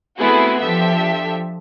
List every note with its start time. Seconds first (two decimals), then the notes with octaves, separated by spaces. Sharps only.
0.18 A3 B3 C4 E4 F#4 G#4
0.63 F3 D4 G4 A4 E5